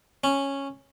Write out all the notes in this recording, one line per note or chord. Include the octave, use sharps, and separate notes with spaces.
C#4